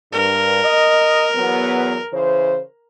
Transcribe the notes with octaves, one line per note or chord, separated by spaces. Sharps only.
G2 A#4
D#5
E2 F#3 B3
C#3 E3 C5